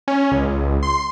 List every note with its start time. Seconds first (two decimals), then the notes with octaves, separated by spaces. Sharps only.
0.08 C#4
0.31 C#2
0.83 C6